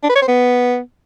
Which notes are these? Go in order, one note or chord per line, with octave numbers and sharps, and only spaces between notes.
D4
B4
C#5
C5
B3